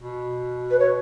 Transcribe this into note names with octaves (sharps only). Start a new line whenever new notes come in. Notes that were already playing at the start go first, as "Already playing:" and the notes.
B2
B4
C#5